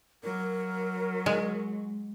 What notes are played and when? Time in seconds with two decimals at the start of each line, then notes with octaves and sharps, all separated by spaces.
0.23 F#3 A#4
1.26 G#3